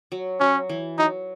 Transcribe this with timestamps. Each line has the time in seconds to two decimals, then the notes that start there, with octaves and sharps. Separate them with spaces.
0.12 F#3
0.40 F#3 C#4
0.69 E3
0.98 F#3 D#4